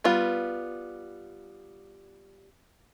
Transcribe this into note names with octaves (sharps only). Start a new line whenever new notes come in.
G3 B3 F4